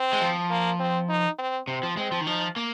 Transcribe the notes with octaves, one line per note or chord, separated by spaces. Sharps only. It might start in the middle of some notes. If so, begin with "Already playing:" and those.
Already playing: C4
G#3
F3
A#3
C4
D#4
C4
C3 C4
F3
G#3 C4
F3
D#3
F3 D#4
A#3